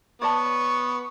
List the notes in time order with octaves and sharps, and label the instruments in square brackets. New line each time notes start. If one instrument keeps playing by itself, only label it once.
[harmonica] B3 [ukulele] C#5 D5 A5 [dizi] C#6